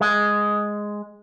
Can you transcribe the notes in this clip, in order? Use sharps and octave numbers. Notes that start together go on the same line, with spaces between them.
G#3